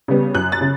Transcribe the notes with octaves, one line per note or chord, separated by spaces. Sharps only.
C#3 G3 B3
F#2 F#6
A6
C#3